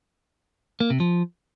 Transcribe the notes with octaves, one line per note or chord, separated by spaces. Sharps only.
A#3
C3
F3